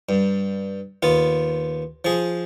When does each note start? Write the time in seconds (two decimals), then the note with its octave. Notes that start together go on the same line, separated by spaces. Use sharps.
0.09 G2
1.03 D#2 B3 F4
2.05 F3 G#4